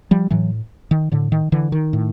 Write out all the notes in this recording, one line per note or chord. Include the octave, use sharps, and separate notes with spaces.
F3 G3
A2 E3 F#3
D#3
A2 D3
D#3
D3 E3
D#3
A2